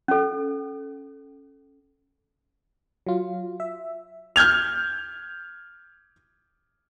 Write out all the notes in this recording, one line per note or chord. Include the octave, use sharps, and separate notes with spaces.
C#4 A4
F#3 F4
E5
F6 G6 G#6 F7